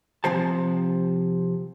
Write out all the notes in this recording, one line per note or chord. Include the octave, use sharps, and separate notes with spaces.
C3 F3 C5 A5